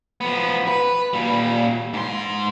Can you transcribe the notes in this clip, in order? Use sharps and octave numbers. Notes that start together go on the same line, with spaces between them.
F3 B3
B4
A#2 G3
G#2 C6